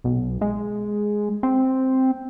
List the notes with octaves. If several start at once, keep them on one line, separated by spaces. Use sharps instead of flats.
B1
G#3
C4